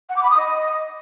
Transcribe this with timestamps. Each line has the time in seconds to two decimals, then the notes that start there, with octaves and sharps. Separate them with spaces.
0.09 F#5
0.16 D6
0.23 B5
0.30 D#6
0.37 D#5